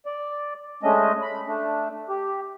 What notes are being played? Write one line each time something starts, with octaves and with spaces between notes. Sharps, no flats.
D5
G#3 A3 C#4 D4 D#5
B5
A3 D4
G4